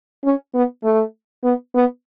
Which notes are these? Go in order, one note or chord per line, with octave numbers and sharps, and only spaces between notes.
C#4
B3
A3
B3
B3